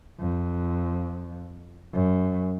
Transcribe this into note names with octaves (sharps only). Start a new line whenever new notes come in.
F2
F#2